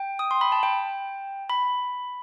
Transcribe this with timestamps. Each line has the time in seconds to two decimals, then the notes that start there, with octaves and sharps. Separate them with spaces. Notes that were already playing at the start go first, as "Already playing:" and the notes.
Already playing: G5
0.19 D#6
0.31 C6
0.41 B5
0.52 A5
0.63 G5
1.50 B5